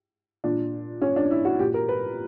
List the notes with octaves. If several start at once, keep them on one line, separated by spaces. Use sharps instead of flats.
A#2 D4
C#4
D4
E4
F#4
A#2 G4
A#4
B4